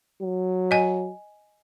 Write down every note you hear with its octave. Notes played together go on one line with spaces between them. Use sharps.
F#3
D#5 G#5